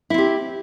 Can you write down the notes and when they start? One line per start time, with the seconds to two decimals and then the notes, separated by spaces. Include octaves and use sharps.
0.10 E4
0.14 C4
0.18 G4